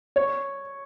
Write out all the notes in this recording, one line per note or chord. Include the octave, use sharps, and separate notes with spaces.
C#5